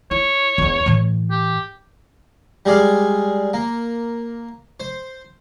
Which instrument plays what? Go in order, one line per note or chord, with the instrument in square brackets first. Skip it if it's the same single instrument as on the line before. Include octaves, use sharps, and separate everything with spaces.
[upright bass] E4 [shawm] C#5
[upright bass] E2 D4
A2 E3
[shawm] G4
[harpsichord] G3 G#3 G#4 D5 F5
A#3
C5